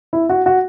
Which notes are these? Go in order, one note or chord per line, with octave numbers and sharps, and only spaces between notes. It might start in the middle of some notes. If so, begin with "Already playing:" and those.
E4
F#4
F#4